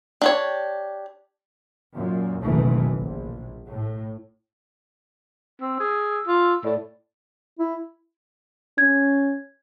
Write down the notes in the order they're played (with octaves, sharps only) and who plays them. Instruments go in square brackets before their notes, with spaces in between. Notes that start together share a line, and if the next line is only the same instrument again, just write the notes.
[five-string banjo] D4 G4 C#5
[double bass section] F#2 A#2
F#1 B1 B2 D#3 E3 A3
A#1
A2
[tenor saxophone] C4 [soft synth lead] E6
[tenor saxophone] G#4
F4
[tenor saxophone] A2 [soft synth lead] D5
[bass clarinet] E4
[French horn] C#4 [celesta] G#6